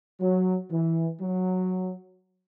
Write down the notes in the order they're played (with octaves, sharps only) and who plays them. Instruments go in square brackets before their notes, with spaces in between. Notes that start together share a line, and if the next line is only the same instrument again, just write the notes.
[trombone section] F#3
E3
F#3